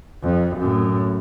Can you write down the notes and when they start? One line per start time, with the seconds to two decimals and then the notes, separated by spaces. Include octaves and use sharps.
0.23 F2
0.57 F#2 A2